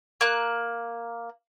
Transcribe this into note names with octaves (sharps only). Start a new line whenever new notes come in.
A#3 F#6